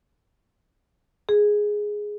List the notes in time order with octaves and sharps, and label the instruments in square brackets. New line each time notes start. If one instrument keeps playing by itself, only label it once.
[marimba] G#4